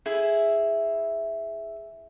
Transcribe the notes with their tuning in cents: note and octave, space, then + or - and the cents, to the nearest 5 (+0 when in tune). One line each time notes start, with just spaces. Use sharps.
E4 +0 G#4 +0